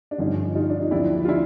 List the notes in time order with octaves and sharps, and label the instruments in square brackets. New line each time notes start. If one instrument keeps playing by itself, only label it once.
[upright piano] D4
G1 G2 D3 F3 C#4 D#4
D#4 F4
D4
D#4
D#2 D3 F3 D4 E4
F4
D4 E4